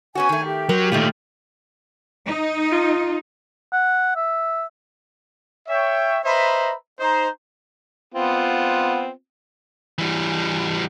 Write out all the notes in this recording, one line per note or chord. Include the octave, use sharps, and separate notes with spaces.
B3 C#4 F#4 G#5
D#3 A3
G4
F#3 A#4
A#2 D#3 G3 A3 F4
D#4
F4
F#5
E5
C#5 E5 G5
B4 C5 D#5 E5 A#5 B5
D#4 C5 A#5
B3 C4 F4
E3 G3